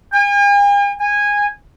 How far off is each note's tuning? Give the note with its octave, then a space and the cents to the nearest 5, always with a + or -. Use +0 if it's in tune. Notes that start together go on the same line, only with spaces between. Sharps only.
G#5 -45
G#5 -15